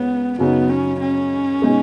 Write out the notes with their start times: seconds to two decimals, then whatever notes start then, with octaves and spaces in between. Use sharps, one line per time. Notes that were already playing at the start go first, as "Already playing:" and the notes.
Already playing: C#2 C#3 B3
0.38 F#2 C#3 F#3 B3 D#4
0.70 C#4
1.00 C#4
1.62 B2 G#3 B3 D#4 G#4